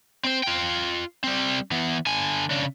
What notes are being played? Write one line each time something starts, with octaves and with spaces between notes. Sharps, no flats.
C4 C5
F4 G5
G3 C4
E3 B3
D3 G#5
C#3 D4